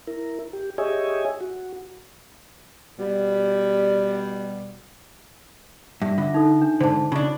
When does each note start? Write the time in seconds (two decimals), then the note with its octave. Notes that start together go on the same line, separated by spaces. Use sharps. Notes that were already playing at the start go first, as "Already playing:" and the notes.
0.07 E4 A#4
0.53 G4
0.78 G4 G#4 C#5 D#5 E5 G#5
1.41 F#4
2.98 B2 G3
6.02 G2 E5
6.18 D3 F4 E5
6.34 D#4 A4
6.61 D4
6.81 G#2 D3 C5 A5
7.12 C#3 D4 F4